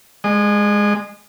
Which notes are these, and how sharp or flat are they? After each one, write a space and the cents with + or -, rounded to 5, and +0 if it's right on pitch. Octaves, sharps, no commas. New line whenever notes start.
G#3 +0 D#5 -35